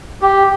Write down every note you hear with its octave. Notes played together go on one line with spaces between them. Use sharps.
G4